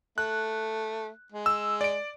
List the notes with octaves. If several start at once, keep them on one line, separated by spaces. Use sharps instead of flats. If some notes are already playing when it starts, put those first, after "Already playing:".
A3 F#6
G#3
E6
D5 D7